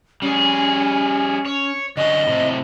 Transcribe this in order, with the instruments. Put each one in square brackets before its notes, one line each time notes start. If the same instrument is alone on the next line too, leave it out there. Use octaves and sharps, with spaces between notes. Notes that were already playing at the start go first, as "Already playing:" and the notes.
[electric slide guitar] G3 G#4 [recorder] C#4
[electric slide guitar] C#5
[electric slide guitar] D3 C#4 F#4 [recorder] D#5
[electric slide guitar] A2 C3 F#3